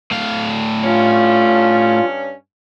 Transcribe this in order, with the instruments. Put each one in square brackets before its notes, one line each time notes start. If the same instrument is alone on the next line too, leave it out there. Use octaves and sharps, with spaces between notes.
[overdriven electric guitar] A2 F5
[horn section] G2 C#4 [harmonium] F4